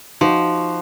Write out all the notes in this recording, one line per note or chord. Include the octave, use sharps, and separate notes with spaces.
F3 D#4 F#4